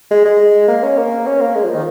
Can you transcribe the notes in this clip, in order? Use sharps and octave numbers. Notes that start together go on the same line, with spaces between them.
G#3
G#3
A#3
C#4
A#3
C#4
A#3
G#3
F3
D#3